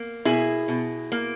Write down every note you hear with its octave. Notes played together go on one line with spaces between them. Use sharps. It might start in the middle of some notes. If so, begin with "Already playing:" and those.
Already playing: A#3
B2 E4 G#4
B2
A#3